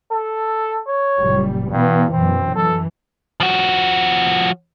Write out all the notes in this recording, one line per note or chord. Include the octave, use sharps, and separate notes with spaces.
A4
C#5
F#1 A#2 G3
G2 B2 E3 B3
F#2 B2 E3 C4
E3 A4
F3 F#4